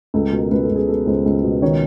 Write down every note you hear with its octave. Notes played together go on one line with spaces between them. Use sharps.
C#2 A4
B2
A#4
C#2 B4
A4
C#2
G#4
B2 A4
C#2 C5
C#2
B2
D#3 C#5